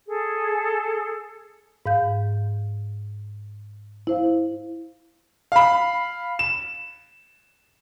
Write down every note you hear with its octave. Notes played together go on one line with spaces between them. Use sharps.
G#4 A4
G#2 F5 G6
E4 C5 F5
F5 B5
E7